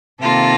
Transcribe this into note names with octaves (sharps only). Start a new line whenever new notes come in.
C3 D#3 A#3 F4 A4